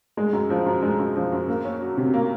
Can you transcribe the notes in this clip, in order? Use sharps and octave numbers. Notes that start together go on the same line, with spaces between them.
G#3
F#2
F3
F#2
G#3
F#2
F3
F#2
A#3
C#4
F#3
C3
A#3